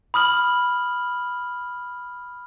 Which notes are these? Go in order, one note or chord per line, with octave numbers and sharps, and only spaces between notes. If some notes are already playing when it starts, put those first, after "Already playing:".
B5 D#6 F6 F#7